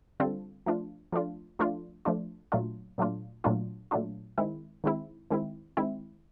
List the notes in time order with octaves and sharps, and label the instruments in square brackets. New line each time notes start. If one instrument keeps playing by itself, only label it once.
[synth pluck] D3 G3 C4 F4 A4
F3 A3 D4 F4
F3 A3 D4 F4
F3 A3 D4 F4
F3 A3 D4 F4
A#2 F#3 A3 D4 F4
A#2 F#3 A3 D4 F4
A#2 F#3 A3 D4 F4
A#2 F#3 A3 D4 F4
D#3 G#3 C4 E4
D#3 G#3 C4 E4
D#3 G#3 C4 E4
D#3 G#3 C4 E4